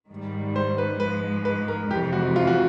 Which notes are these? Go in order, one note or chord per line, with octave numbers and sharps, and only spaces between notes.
G#2 D#3 G3
C5
B4
G#2 F3 G#3 B4
B4
A#4
F2 C3 E3 G#3 G4
F#4
F4
F#4